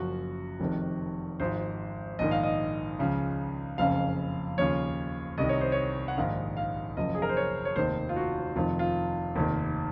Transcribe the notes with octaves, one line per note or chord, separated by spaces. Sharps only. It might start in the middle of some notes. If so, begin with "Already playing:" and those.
Already playing: F#1 F#2 F3 F#4
F1 F2 C3 D#3
G#1 G#2 F3 C5
A#1 G#2 D#3 D#5
F5
D#5
C#2 C#3 F3
F#1 F2 C#3 F5
D#2 C#3 F3 C#5
C2 C3 D#3 D#5
C#5
C5
C#5
F#5
A#1 G#2 D#3 F5
F5
F#1 F#2 F3 D#5
G#4
A#4
C5
C#5
C#5
F1 D#2 D#3 C5
F4
F#4
F1 F2 D#3 F4
F4
F1 D#2 D#3